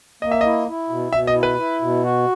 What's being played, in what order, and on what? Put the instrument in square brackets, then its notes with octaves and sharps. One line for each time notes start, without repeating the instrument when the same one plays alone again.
[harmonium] A#3 [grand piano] D#5
[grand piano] E5
[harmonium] E4 [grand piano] D#5
[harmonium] E4
B2
[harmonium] B2 [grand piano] E5
[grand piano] D#5
[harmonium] E4
[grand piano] B4
[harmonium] E4
B2
F#4